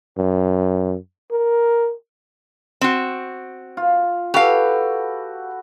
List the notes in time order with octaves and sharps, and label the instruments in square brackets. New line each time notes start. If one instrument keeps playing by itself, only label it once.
[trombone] F#2
A#4
[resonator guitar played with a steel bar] C4 F#4
[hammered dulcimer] F4
[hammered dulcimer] F#4 A4 B4 [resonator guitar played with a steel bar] G4 F5